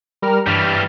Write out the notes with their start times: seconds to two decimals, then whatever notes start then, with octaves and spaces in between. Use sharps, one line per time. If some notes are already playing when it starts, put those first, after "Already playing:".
0.22 G3 A#4 F6
0.46 G2 E3 G3 F6